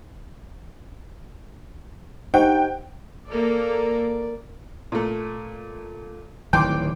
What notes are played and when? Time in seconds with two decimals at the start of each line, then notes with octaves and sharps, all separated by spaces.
2.34 D4 D#4 G4 C5 F#5 G5
3.28 A#3 A4 A#4 D5
4.92 A#2 A3
6.53 D1 D#3 E3 G5 C6 D6